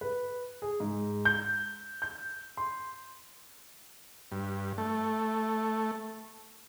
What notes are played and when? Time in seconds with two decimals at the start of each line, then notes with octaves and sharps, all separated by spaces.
0.01 B4
0.62 G#4
0.80 G#2
1.25 G6
2.02 G6
2.57 C6
4.32 G2
4.78 A3